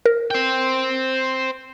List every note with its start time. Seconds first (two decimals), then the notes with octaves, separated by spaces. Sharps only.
0.06 A#4
0.31 C5 G5